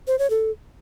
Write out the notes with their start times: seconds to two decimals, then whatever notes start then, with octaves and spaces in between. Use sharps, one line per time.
0.07 C5
0.19 C#5
0.30 A4